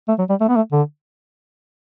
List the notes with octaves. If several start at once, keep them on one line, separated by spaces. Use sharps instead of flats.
A3
F#3
G3
A3
B3
A3
D3